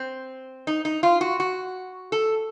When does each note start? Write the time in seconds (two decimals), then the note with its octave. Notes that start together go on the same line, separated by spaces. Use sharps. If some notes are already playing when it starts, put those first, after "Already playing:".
Already playing: C4
0.67 D#4
0.85 D#4
1.03 F4
1.21 F#4
1.40 F#4
2.12 A4